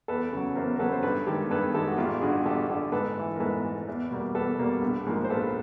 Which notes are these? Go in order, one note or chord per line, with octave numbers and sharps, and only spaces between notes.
E2 A4 B4
C#3 F#3
E2 A#4 C5
A#4
C#3 F#3 A4 B4
C5
G2 A4 B4
D#3 G#3 G4 A4
G2 A4 B4
D#3 G#3 G4 A4
F#4
A1 F4 G4
G2 D3 F#4 G#4
A1 G4 A4
G2 D3 G4 A4
G#2 A4 B4
E3 A3
A#4
G#2 A4 B4
E3 A3
E2
B2 G3 A#3
E2 A4 B4
B2 G3 A#3
A#1
G#2 F3 A#3
C5
A#1 A4 B4